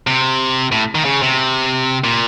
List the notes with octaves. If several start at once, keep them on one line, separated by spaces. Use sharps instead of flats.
C3
A2
D#3
C#3
C3
A#2